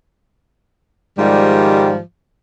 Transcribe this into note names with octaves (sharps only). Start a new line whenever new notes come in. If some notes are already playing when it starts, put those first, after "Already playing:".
G#2 D#3 F3 G3